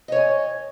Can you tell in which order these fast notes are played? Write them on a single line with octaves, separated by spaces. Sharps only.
D#5 C#5 G#5